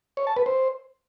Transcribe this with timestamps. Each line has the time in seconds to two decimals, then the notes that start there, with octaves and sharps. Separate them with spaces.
0.17 C#5
0.27 A5
0.36 B4
0.46 C5